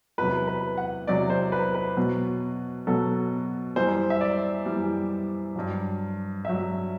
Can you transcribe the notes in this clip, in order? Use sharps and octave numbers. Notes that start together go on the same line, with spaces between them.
E2 C3 F#3 B4
B4
F#5
E2 C3 F#3 D5
C5
B4
B4
B2 F#3
B2 F#3 A4
F#2 E3 G3 C5
E5
D5
F#2 E3 G3
G2 F#3
G2 F#3 E5